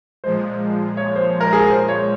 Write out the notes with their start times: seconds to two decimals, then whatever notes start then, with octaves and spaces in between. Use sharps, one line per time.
0.24 A#2 F3 G#3 C5
0.97 C#5
1.16 C5
1.40 A#4
1.53 G#4
1.70 C5
1.88 C#5